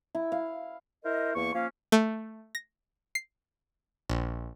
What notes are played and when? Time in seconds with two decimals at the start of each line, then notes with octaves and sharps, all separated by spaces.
0.15 E4
0.32 F5
1.04 E4 A#4 C5 D#5
1.34 E2 A#3 C#6
1.54 F3 A#3 C#4 F5
1.92 A3
2.55 A#6
3.15 C7
4.09 A#1